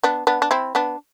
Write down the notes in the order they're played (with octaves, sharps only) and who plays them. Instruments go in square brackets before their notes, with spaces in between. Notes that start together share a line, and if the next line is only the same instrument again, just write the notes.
[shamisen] B3 D4
B3 D4
D4
C4 E4
B3 D4